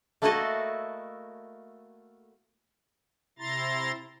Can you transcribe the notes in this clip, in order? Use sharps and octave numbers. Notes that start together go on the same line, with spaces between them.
A3 A#3 E4 F#4 A4 D#5
C3 E4 A#5 C6 A6